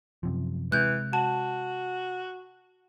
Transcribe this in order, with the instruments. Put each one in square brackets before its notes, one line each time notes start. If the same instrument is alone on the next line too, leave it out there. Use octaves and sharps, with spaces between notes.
[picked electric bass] F#2 C3 F3
[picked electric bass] C3 G#3 [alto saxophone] E3 [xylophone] F#6 G6
[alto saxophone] F#4 [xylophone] A5